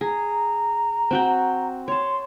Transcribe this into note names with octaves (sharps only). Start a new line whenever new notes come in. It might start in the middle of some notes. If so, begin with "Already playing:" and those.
G#4 A#5
C4 F#4 G5
C#5 A5 C6